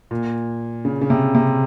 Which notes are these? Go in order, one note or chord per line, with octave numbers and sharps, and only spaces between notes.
A#2
C#3
C#3
C3
C3